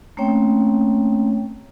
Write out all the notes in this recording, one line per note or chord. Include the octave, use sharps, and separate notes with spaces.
A3 A#3 C4 C#4 C#5 G5